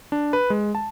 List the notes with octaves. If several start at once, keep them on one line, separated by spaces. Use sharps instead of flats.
D4
B4
G#3
A5